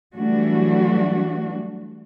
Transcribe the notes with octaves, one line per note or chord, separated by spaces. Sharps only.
E3 F#3 G3 A3 D4 F#4